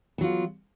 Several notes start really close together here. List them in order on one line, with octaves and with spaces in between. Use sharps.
B3 F#3 F4